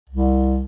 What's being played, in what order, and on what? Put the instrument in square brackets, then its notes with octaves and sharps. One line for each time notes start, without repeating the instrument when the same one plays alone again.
[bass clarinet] C2